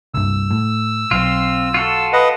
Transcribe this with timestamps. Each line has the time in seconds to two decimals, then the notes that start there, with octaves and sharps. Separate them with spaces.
0.14 C2 G2 E6
0.51 A2
1.11 B1 C4 F4
1.74 F4 F#4 A4
2.13 B4 D#5 F#5